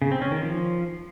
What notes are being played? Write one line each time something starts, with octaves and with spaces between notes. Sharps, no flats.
C#3
C4
C#4
D#3
F3